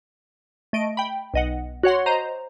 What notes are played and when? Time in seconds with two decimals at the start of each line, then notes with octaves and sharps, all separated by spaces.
0.73 A3 D#5 D7
0.97 G5 B5
1.34 B1 D#5 F#5
1.83 F#4 C#5 F#5 C6
2.06 C5 D#5 A#5